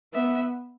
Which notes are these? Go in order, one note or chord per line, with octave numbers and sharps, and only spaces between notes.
B3 E5